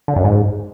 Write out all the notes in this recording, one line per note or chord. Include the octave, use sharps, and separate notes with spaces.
D3
F#2
G#2